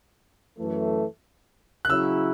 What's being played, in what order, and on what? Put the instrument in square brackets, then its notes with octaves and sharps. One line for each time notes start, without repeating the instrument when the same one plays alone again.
[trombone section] F#2 E3 A3
[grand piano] F#6
[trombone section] C#3 F#3 C#4 E4 [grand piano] E6